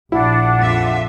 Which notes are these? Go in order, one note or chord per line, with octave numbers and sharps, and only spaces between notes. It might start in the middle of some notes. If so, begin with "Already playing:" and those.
A#1 D4 E4 F#5
F2 F4 E5